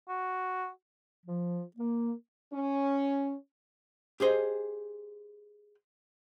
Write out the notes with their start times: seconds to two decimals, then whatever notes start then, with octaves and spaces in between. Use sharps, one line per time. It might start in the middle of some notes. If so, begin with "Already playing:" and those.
0.08 F#4
1.26 F3
1.77 A#3
2.52 C#4
4.20 G4 G#4 C5 D#5 G#5